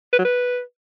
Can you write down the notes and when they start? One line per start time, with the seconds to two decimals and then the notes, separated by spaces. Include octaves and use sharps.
0.13 B4
0.19 F#3
0.25 B4